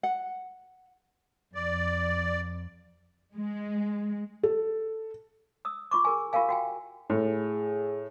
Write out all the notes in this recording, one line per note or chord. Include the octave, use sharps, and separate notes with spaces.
F#5
F2 D5
G#3
A4
D#6 E6
F4 C#6 D6
G#4 A#4 G#5
F4 G4 A#4 F5 G#5
F#4 G5 G#5
A2 G#4